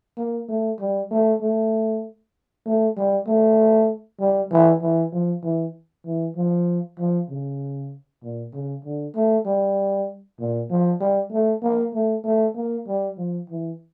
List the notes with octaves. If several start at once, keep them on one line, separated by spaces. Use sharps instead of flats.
A#3
A3
G3
A3
A3
A3
G3
A3
G3
E3
E3
F3
E3
E3
F3
F3
C#3
A#2
C#3
D3
A3
G3
A#2
F3
G3
A3
A#3
A3
A3
A#3
G3
F3
E3